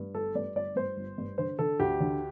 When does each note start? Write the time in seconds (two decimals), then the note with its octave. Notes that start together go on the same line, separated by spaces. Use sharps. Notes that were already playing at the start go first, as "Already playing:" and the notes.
Already playing: G2
0.15 G1 A4
0.35 G2 D5
0.56 G1 D5
0.76 G2 C5
0.97 G1
1.18 G2
1.38 D3 C5
1.59 D3 A4
1.80 D2 G4
2.00 D3